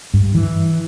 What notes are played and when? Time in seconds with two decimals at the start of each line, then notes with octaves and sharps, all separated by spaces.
0.14 G2
0.35 E3